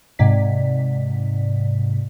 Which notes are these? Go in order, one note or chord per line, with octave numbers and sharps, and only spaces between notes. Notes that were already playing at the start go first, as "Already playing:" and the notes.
G#2 C3 D5 B6